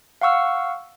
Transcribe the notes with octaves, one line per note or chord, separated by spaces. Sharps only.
F5 F#5 C#6 E6 F6